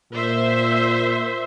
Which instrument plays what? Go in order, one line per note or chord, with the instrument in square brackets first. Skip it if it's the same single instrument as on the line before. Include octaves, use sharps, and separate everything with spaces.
[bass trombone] A#2 [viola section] C5 E5